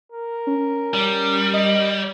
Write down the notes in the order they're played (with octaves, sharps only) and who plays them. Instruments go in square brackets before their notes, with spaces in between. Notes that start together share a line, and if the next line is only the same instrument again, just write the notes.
[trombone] A#4
[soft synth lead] C#4
[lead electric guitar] G3
[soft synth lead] D#5